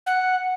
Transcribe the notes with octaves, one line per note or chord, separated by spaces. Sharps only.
F#5